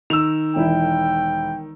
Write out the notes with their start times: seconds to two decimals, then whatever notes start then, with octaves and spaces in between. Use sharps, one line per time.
0.10 D#3 E6 F7
0.56 E1 E4 G5